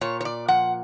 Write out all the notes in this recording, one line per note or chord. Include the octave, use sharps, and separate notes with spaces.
A#2 C#5
C#5
D5
F3 F#5